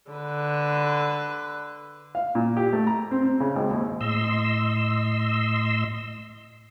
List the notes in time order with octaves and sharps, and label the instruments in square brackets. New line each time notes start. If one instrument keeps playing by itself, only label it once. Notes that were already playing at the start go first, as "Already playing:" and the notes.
[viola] D3 B4
[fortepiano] F5
A#2
G4
A3
A#5
C4
C4
C#3
G#1
D#2
[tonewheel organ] A2 D#5 C6 E6